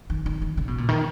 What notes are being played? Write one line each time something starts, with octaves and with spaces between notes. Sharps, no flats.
D#3
D#3
D#3
C#3
B2
A#2
D#3